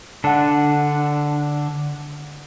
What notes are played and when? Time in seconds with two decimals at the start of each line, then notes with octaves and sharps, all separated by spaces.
0.24 D3 D4 F#5 A5